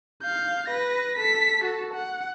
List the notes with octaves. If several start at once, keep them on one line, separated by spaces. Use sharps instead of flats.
F5 G6
B4 A#6
A4 B6
F#4 A4
F#5